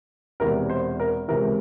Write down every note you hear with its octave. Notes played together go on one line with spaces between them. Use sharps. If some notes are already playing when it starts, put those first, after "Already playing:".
E1 E2 C3 E3 A#4
C5
A#4
C#2 C3 E3 A#4